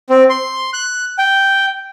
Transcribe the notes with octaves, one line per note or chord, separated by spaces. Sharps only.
C4
C6
F#6
G5